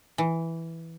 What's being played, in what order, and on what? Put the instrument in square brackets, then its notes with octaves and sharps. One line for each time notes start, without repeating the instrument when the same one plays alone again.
[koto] E3